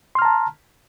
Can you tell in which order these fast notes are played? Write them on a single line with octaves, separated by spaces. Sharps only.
C6 F6 A#5 A5